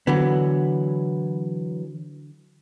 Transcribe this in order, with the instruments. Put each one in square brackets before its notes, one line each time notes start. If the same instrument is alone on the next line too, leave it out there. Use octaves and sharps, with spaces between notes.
[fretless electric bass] D3 [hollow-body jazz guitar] E3 F#3 B3